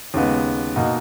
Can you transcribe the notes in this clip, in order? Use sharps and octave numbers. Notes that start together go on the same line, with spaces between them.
D#2 C#3 G#3 B3
B2 A#3 D#4 F#4